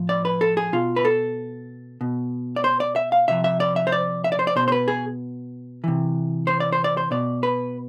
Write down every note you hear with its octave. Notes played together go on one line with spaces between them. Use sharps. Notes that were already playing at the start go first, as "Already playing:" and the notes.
Already playing: A2 F3
D5
B4
A4
G#4
B2 F4
B4
A4
B2
D5
C5
D5
E5
F5
C3 F3 E5
E5
D5
E5
C5
D5
E5
D5
C5
D5
B2 C5
C5
B4
G#4
C3 E3
C5
D5
C5
D5
C5
B2 D5
B4